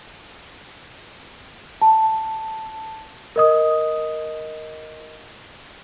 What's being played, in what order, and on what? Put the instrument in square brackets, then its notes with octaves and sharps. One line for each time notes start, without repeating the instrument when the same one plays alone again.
[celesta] A5
A#4 D#5 D#6